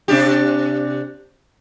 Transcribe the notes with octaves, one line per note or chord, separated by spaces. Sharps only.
C3 D4 G4